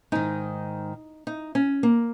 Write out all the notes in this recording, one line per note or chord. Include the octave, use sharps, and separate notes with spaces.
G#2 D#3 D#4
D#4
C#4
A#3